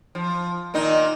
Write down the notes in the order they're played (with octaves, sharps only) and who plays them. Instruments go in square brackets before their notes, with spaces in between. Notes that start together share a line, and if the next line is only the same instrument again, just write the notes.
[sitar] F3
A#2 D#3 D#4